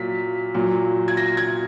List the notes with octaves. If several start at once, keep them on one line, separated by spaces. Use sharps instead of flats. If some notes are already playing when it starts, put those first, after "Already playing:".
Already playing: A#2 F#3 B6
A#2 F#3
G#6
A#6
G#6